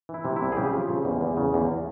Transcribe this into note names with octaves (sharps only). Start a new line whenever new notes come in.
E3
E4
C3
C2 E4
G#4
C#3 G4
F3
C#3
E2
E2
C#3
E2